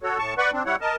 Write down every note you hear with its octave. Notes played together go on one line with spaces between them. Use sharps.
F#4 A4 C#5
A2 A5 C#6
B4 D5 F#5 B5 C#6
C4 D4
G3 E4 C#5 F#5
A#4 D#5 A5